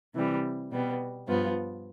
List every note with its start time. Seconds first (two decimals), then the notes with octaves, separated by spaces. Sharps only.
0.15 C3 E3 G3
0.71 B2 G3 B3
1.28 G2 F3 B3 F4